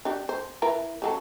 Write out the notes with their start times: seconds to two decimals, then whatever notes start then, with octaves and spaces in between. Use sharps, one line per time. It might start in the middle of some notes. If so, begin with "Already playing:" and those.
0.05 D4 G4
0.29 C5
0.62 E4 A#4 B4
1.02 C#3 F#3 A4